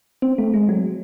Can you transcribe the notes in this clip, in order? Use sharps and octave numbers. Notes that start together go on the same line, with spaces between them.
C4
A3
G#3
F#3